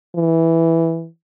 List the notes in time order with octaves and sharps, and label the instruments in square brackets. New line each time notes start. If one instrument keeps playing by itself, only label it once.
[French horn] E3